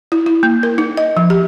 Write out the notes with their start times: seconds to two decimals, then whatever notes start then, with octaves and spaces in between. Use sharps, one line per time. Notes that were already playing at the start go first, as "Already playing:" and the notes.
0.12 E4
0.26 E4
0.43 A#3
0.63 A#4
0.78 D#4
0.97 D#5
1.17 F3
1.30 G4